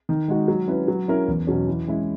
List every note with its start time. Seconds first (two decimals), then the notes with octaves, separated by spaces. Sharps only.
0.09 D#3
0.28 G#3 D#4 F#4
0.48 F#3
0.68 C#4 E4 B4
0.88 F#3
1.08 C#4 E4 A#4
1.28 E2
1.47 B2 F#3 C#4
1.67 E3
1.88 G#3 C#4 E4